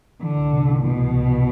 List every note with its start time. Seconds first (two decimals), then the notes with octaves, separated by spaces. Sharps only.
0.22 D3 E3
0.37 C2
0.53 C3
0.68 E3
0.83 B2 E3
0.99 C2
1.14 C2
1.30 C3